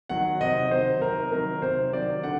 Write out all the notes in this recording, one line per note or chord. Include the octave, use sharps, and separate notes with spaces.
D#3 F#3 F#5
C3 D#5
D#3 F#3 C5
C3 A#4
D#3 F#3 A#4
C3 C5
D#3 F#3 D5
D3 F#5